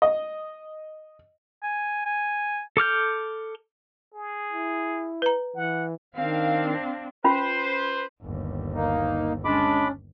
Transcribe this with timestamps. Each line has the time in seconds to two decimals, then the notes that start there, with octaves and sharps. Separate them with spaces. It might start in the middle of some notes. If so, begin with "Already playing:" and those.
0.02 D#5
1.63 G#5
2.06 G#5
2.77 A4 D6 F6 G6
4.13 G#4
4.53 E4
5.22 B4 A#5
5.56 E3 F#5
6.16 D#3 C4 D4 F5
7.24 C#4 F4 B4 C5 B5
8.22 G1 D#2
8.73 A#3 D#4
9.45 G#3 C#4 D4 B5 D6